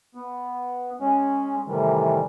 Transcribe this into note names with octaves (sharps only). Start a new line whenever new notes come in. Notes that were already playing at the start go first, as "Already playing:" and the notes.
B3
G#3 C#4
A2 C3 D#3 E3 G3